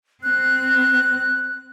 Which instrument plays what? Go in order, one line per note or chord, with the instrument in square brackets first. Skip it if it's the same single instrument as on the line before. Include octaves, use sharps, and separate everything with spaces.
[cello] C4 [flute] F#6